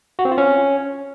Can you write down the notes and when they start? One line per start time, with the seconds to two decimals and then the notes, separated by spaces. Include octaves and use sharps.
0.19 F#4
0.25 C4
0.31 F4
0.38 C#4